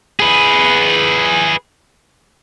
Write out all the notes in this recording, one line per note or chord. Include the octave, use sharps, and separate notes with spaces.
G#4 B4